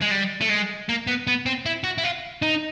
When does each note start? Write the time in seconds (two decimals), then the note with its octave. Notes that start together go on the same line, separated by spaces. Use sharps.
0.02 G#3
0.12 G3
0.41 A3
0.50 G#3
0.89 A#3
1.07 B3
1.27 B3
1.46 C4
1.66 E4
1.84 F#4
1.98 E4
2.04 F4
2.42 D#4